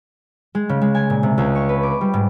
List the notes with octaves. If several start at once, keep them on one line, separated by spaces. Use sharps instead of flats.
G#3
C#3
G#3
G#5
A#2
C3
C#2
C#6
B4
D6
G3
G#2